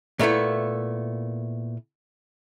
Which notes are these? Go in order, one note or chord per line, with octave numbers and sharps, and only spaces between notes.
A#2 A3 B3 E4